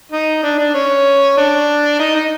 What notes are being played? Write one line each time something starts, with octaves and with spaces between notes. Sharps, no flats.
D#4
D4
D4
C#4
D4
D#4
D#4